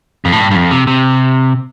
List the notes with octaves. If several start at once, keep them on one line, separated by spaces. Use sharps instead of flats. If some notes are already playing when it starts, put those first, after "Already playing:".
F2
A2
G2
G2
F2
C3
C3